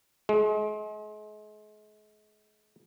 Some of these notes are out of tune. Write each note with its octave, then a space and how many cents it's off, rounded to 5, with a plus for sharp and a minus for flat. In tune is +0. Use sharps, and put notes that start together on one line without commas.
G#3 +35